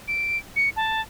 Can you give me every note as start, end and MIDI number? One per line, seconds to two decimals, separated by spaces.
0.08 0.38 98
0.56 0.69 97
0.76 1.01 81